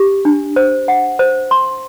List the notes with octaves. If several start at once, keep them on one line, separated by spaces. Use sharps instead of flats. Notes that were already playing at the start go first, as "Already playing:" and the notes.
Already playing: G4
D4
C5
F#5
C5
C6